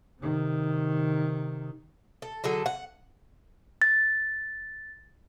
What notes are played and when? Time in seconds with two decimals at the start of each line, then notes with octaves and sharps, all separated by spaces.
0.21 C3 D#3
2.22 A4
2.44 D3 F#3 G#4 A4
2.66 F#5
3.82 A6